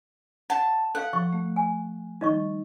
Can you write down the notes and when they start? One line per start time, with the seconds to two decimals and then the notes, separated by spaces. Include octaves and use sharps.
0.50 F#5 A5
0.95 A4 F5 F#5
1.13 F3 C#6
1.33 A3
1.56 G#5
2.21 D#3 G3 D#4 D#5 C#6